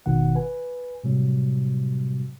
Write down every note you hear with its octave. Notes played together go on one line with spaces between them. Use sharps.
G#1 B2 D#3 F#5
B4 G#5
A2 C3 F#3 G3